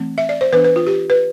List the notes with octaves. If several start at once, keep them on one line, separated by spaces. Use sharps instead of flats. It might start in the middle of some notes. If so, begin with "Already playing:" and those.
Already playing: E3 A3 C4
E5
D5
C5
E3 B3 D4 B4
B4
F4
G4
B4